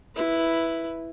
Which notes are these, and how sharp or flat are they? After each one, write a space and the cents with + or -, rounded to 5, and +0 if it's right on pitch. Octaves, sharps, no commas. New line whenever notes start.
E4 +0 B4 +0